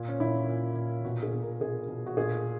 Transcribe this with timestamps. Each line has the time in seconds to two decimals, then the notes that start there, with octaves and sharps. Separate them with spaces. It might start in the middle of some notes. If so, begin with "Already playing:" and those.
Already playing: A#2
0.08 C#4
0.20 A#2 E4
0.48 A#2
0.76 A#2
1.05 B2 F#4
1.23 G#4
1.33 B2
1.42 A#4
1.61 B2 G#4
1.88 B2
2.06 F#4
2.17 A#2 G#4